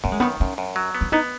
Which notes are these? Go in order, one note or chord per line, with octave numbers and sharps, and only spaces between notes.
F#2 B3
G#3
D#3 B3
F#2 C#4
F#2
F#3
B3
C#4
B3 D#4